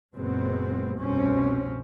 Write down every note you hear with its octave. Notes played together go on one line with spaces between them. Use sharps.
F#1 A#2 G#3 B3 C4
F1 C2 G2 B2 C4 C#4